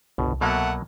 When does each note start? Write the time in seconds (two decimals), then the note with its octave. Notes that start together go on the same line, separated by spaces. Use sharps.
0.18 G1 C2 B2
0.41 B2 F#3 A3 A#3 F#5